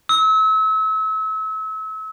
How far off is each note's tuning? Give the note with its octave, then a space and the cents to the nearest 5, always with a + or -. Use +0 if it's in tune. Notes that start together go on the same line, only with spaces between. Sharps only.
E6 -35